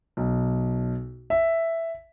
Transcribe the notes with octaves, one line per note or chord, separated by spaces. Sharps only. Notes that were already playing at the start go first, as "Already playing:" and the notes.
B1
E5